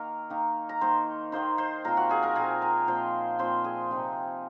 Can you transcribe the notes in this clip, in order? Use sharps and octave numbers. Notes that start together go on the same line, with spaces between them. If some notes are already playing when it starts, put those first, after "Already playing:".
Already playing: D#3 A#3 D#4 A#4 A#5
D#3 A#3 D#4
A#5
D#3 A#3 D#4 C5 C6
D#3 A#3 D#4 C5 C6
C5 C6
A#2 F3 C4 A#4 A#5
F#4 F#5
G#4 G#5
A#4 A#5
A#2 F3 C4 G#4 G#5
A#4 A#5
A#2 F3 C4 C5 C6
A#2 F3 C4 C5 C6
G#4 G#5
C3 F3 C4 D#4